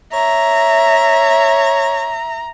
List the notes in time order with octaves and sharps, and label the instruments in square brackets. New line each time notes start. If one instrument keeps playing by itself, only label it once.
[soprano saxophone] C#5 [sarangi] E5 [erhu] A#5